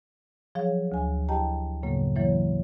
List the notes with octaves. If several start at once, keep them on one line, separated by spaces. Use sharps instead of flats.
F3 F#3 G#4 C#5 F5
D2 G#5
E4 G4 D#5 G5 A5 A#5
F#2 A2 C#3 F#3 A#3 B3
E3 F#3 A#3 E4 C#5